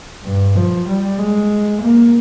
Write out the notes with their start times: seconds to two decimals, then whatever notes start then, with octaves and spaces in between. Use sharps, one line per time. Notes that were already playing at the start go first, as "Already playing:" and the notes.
0.24 G2
0.55 F3
0.88 G3
1.18 G#3
1.81 A#3